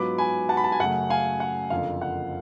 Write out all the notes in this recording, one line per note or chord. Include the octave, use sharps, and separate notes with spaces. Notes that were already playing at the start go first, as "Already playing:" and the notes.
Already playing: G#2 F#3 B3 F4 B5 D6
G#5 B5
F#5 A5
B5
A5
G#5
F#2 C#3 F#3 A3 F#5
F5 G#5
F#5
F#1 F2 D3 F3 F5
F#5